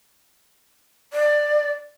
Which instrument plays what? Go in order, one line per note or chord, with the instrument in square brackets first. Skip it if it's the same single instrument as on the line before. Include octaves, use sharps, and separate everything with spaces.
[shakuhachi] D5